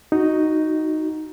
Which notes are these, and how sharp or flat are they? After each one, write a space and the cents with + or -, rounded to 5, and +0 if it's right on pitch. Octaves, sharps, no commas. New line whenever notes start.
D#4 +0 F#4 +0